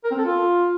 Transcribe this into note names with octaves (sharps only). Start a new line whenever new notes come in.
A#4
C4
A4
F4